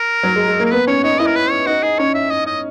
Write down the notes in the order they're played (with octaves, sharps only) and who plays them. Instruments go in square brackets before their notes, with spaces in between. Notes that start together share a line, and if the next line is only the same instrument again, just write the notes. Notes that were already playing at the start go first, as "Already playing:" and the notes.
Already playing: [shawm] A#4
[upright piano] F#3
G#3
G#3
A#3
[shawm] A#4
[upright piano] B3 [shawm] B4
[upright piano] C#4 [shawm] C#5
[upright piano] D#4 [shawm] C#5
[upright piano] E4 [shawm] D#5
[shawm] A#4
B4
C#5
[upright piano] D#4 [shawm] F#4
[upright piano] D#4 [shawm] G#4
[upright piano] C#4 [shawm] C#5
[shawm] E5
D#5
D#5